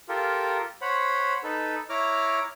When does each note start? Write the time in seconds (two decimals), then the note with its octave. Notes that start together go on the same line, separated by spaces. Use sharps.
0.09 F4 G4 A4 A#4
0.81 C5 C#5 F#5 B5
1.44 D#4 A4 B4
1.90 E4 C#5 A#5 D6 F6